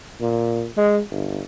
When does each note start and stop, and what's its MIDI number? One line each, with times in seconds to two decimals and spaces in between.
0.21 0.65 46
0.77 1.00 56
1.11 1.41 31